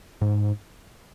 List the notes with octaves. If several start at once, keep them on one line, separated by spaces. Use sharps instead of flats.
G#2